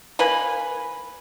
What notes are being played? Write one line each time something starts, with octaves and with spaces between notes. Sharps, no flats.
A#3 B4 G#5 B5